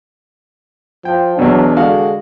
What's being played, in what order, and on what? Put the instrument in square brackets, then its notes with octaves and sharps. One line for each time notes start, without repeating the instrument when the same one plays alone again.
[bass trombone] F3 [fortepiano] G5
[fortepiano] E2 B2 [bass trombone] F#3 [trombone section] D4
[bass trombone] D3 [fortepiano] G#3 F#4 F5